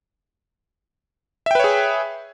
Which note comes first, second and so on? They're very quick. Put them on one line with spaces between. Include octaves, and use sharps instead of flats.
E5 G5 B4 C#5 G#4